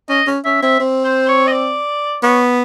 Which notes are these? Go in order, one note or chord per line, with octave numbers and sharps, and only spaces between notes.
C#4 D#5
C#4
C#4 E5
C4 E5
C4
C5
C#5
D#5
D5
B3 C#5